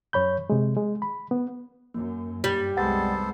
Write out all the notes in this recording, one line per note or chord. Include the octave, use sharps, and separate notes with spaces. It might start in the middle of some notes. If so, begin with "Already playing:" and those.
F#2 C#5 B5 G6
C3 G#3
G#3
B5
B3
F#2 A#3
G2 G3
C2 G#3 B3 A4 C5 F#5 A6